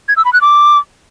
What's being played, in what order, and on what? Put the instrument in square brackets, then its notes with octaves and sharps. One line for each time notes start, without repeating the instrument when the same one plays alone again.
[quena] G#6
E6
B5
F#6
D6